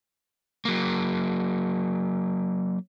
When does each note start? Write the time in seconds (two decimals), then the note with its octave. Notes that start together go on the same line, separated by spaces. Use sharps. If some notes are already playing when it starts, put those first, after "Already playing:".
0.65 F#3 A#3